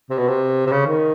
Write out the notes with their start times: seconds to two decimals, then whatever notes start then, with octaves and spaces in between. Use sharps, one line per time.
0.10 C3
0.18 B2
0.28 C3
0.66 C3
0.72 C#3
0.86 D#3